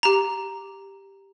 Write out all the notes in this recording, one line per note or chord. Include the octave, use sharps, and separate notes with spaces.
G4 A#5